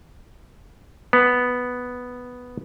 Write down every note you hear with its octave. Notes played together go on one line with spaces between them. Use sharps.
B3